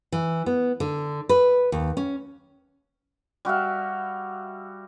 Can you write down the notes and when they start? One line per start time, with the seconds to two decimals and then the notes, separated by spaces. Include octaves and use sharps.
0.12 E3
0.46 B3
0.80 D3
1.29 B4
1.72 D#2
1.97 C#4
3.45 G3 F#4 E5 F5